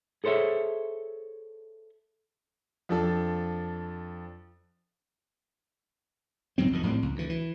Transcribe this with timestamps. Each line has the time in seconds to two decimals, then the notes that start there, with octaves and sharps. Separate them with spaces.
0.24 G#4 A4 C5 C#5 E5
2.89 F2 F3 D4 A4
6.58 C#2 G#2 F#3 C4
6.71 G#1 F2 D#3
6.83 A#1 A2 G3 C4
7.02 C#2
7.16 D2 E3
7.29 E3